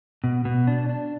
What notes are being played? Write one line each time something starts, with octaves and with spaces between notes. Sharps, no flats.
B2
B2
D4
D4